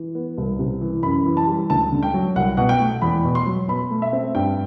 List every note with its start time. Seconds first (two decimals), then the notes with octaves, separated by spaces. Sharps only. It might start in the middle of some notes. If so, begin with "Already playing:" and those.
Already playing: E3
0.15 B3
0.38 C2
0.59 C3
0.81 E3
1.03 F#2 B5
1.26 E3
1.37 A5
1.47 G3
1.70 D2 A5
1.92 D3
2.03 G5
2.14 F#3
2.36 C2 F#5
2.57 B2 F#5
2.69 G5
2.80 A3
3.02 E2 B5
3.24 B2
3.35 C6
3.46 F#3
3.69 B2 B5
3.91 A3
4.02 E5
4.13 C4
4.35 G2 G5